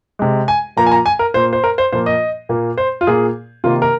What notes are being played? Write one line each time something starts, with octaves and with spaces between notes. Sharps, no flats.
C3 G#3
G#5
A#2 F3 A#3 A#5
G#5
A#5
G#5
A#4
A#2 A#3 C5
C5
A#4
C5
A#2 F3 A#3 C5
D#5
A#2 A#3
C5
F4
A#2 A#3 G#4
C3 D#3 A#3 F4
A#4